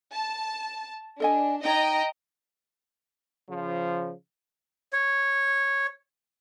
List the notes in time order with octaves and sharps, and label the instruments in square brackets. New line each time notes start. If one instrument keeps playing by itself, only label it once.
[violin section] A5
[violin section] D4 [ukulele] A4 D#5 G#5
[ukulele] D#4 C#5 [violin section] D#5 G5 A#5
[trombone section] C#3 F3
[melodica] C#5